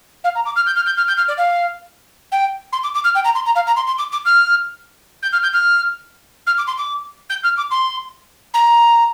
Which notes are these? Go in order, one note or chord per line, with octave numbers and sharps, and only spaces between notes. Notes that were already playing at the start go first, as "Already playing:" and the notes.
F5
A#5
D6
F6
G6
F6
G6
F6
G6
F6
D5
F5
G5
C6
D6
D6
F6
G5
A#5
C6
A#5
F5
A#5
C6
C6
D6
D6
F6
G6
F6
G6
F6
F6
D6
C6
D6
G6
F6
D6
C6
A#5